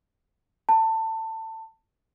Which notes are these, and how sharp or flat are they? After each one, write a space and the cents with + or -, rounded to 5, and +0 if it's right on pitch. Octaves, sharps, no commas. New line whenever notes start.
A5 +25